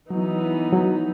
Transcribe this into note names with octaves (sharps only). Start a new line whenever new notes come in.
E3 F#3 B3 D#4
F#3